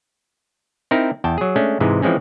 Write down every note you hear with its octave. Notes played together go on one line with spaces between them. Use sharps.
C4 D#4 E4 A#4
E2 G5 A5
F#3 G#4
G#3 A3 C#4 D4
G#2 C3 E3 G#3
E3 F3 G#3 C4 C#4